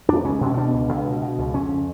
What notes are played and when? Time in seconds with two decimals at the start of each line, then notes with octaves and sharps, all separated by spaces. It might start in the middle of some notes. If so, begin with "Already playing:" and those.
0.09 F2 D4
0.24 C#2 C#4
0.41 B2
0.46 C#4
0.57 B2 D4
0.73 C#2
0.89 C#2
1.05 B2
1.22 B2
1.38 C#2
1.54 F2 C#4
1.71 C#3